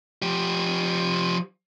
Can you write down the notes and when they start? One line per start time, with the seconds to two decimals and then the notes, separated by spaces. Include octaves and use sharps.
0.22 F3 G4